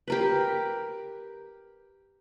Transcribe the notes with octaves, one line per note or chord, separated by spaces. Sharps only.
G4 A#4 B4